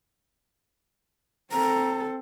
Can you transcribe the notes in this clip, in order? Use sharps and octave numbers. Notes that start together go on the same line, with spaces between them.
C4 A4 A#5